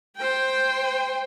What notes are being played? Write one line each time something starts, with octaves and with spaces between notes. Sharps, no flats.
C5 G5